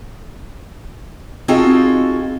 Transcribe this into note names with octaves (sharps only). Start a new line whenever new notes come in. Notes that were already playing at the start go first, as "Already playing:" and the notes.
C4 D#4 F4 F#4 G#4 A4